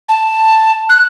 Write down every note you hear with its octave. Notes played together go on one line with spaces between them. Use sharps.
A5
F#6